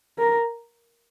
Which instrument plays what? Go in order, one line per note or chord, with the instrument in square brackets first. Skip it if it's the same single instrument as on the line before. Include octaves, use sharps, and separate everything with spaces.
[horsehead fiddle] A#4